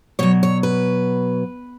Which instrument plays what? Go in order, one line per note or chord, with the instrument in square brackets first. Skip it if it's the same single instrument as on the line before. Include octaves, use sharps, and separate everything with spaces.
[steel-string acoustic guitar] B2 F#3 C#5
C#5
B4